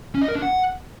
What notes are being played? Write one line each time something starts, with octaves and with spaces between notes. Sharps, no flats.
C#4
D#5
A#4
D4
F#5